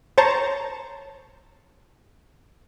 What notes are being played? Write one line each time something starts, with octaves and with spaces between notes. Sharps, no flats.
C5 C#5 A5 A#5